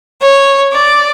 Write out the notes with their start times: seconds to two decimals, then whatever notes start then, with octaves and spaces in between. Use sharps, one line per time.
0.20 C#5
0.71 D5